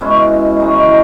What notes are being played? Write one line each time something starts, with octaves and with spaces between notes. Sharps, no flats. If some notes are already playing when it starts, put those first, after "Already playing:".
B2 G#3 C#4 E4
E3 G#3 D#4 F#4